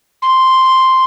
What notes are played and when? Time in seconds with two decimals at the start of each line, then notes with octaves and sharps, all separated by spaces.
0.22 C6